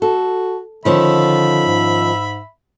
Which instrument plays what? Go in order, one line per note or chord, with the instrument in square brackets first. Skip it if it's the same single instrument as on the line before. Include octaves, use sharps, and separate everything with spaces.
[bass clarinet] F#4 [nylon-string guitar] A4
[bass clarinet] D3 [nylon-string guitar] D#3 F3 C#4 [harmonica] E5 B5
[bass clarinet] G#2